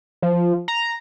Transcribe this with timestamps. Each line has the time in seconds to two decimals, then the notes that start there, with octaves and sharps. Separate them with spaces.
0.22 F3
0.68 A#5